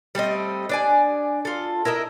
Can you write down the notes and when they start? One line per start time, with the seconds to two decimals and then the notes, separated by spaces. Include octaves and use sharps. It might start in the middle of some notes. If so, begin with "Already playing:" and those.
0.15 G3 A3 C4 D#5
0.69 D4 D5 G#5
1.45 F4 A4
1.85 E4 A#4 D#5 E5